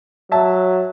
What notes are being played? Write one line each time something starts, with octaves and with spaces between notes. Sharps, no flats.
F#3 E5 A5